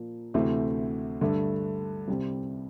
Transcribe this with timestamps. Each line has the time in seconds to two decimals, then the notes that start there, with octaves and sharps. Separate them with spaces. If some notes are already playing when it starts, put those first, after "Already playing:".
Already playing: A#2 F3 A#3
0.34 D2 C3 E3 A3 C4
1.21 G2 D3 A3
2.08 C2 C3 G3 C4